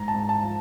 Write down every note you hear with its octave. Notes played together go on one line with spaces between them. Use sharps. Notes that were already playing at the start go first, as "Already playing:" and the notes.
Already playing: G#2 A#5
A5
G#2
A5
F3